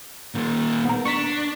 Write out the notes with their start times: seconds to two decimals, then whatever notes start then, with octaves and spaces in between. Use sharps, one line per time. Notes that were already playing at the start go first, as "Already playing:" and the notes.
0.35 A#2 D#3
0.85 B3 A#4
1.05 D4 C#6 B6